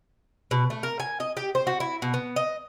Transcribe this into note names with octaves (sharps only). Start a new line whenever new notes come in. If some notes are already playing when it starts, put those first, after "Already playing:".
B2
A3
A#4
G#5
D#5
G4
C5
F#4
E4
B2
B3
D#5